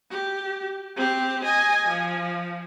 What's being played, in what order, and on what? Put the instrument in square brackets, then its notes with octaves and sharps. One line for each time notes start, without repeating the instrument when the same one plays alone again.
[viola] G4
C4 G4
D#5 G#5
F3